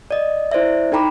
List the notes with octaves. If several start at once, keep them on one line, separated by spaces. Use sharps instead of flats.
D5 D#5
E4 C5 D5 E5
D#4 A4 G5 A#5 B5 D6